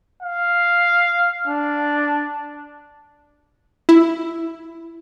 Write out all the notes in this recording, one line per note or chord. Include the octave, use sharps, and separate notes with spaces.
F5
D4
E4